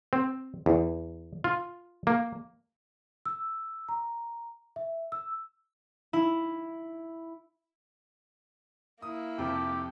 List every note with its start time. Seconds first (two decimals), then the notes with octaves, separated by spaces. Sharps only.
0.13 C4
0.66 E2
1.44 F4
2.07 A#3
3.26 E6
3.89 A#5
4.76 E5
5.12 E6
6.13 E4
9.02 A#3 E4 D#6
9.39 F2 C3 F3 G4